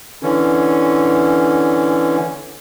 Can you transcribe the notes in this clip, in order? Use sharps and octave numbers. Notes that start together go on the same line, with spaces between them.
D3 E3 C#4